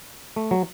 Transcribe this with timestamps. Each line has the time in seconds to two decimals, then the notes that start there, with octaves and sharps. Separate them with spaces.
0.36 A3
0.51 F#3